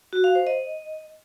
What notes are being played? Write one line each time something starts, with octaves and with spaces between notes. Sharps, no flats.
F#4
F5
C5
D#5